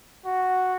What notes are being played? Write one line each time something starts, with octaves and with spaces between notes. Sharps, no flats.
F#4